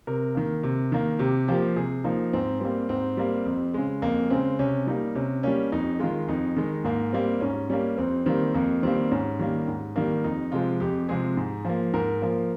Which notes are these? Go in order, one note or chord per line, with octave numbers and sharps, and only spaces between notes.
C3 A#4
D#3 A#3
C3
D#3 A#3
C3 G4
F3 A#3 G4
C3 G#4
F3 A#3 D#4
G#2 C4
G3 A#3 C4
G#2 C4
G3 A#3
F2
C#3 G#3
F2 A#3
C#3 G#3 C4
C3 C#4
G3 A#3 D#4
C3 C#4
G3 A#3 C#4
F2 D#4
D#3 G#3 F4
F2 D#4
D#3 G#3
G#2 A#3
G3 A#3 C4
G#2 C#4
G3 A#3 C#4
F2 C4
D#3 G3 A#3 C4
F2 A#3
D#3 G3 A#3 C4
G#2 C#4
D#3 G3 A#3
G#2
D#3 G3 A#3
F2 D#4
C3 F3 G#3 F4
F2 G4
C3 F3 G#3 G#4
G#2
F3 A#3
G#2 A#4
F3 A#3